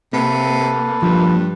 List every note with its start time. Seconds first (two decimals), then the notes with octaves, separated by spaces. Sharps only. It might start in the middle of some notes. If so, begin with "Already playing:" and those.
0.13 C3 A#3 A4 B4
1.02 G2 F3